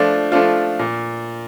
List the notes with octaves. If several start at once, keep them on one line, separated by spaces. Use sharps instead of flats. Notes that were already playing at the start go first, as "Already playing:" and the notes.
Already playing: F3 A3 D4 F4
F3 A3 D4 F4
A#2